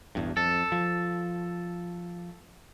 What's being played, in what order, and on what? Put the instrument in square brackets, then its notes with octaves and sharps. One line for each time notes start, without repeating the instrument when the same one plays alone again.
[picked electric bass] A1 E2 G2
[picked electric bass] F2 [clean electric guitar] A4
[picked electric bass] F3